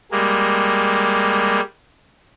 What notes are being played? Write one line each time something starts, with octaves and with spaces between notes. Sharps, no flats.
G3 G#3 A#3